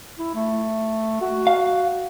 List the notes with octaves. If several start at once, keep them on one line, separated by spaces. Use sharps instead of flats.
E4
A3
F#4
F5